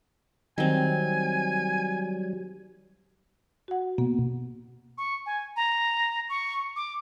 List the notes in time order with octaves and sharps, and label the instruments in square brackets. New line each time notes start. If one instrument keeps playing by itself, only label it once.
[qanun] D#3 C4 [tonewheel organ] F#3 G3 [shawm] G#5
[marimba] F#4 F#5
[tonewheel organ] B2 [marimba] A#3
[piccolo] C#6
G#5
A#5
C#6
D6